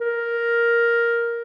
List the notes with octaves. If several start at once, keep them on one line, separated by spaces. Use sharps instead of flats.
A#4